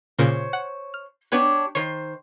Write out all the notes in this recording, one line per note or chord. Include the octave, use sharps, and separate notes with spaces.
A#2 C#3 A#3 C5 C#5
F#5
F6
B3 D4 G4 B4 C#5
D#3 C5 C#5